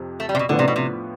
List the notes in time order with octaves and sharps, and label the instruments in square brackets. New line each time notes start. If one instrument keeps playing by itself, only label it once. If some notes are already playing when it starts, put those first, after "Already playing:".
Already playing: [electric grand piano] F2 C3
[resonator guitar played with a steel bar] A3
G3
C3
B2
[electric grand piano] A2 F3 B3 F4 B4 [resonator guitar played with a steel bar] D3
[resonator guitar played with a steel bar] C3
B2
C3